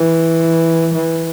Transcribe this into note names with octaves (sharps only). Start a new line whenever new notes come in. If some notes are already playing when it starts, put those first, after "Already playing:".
Already playing: E3
E3